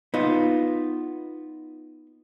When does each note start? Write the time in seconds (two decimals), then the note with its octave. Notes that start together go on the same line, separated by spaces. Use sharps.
0.14 B3 D#4 F4